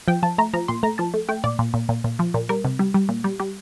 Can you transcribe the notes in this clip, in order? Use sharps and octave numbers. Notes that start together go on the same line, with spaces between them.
F3 G5
F3 A5
A3 A#5
F3 A#5
A#2 C6
A3 A#5
F3 A5
A3
A3 G5
A#2 D5
A#2
A#2
A#2
A#2
F3
A#2
G3 A#4
C3
G3
G3
A#2
G3
G3